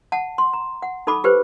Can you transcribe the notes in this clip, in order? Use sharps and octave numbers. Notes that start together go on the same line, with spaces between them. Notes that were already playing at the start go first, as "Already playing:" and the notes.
F#5 A5
C6
A#5
F#5
D#4 A4 A5 B5 D6
G4 B4 C5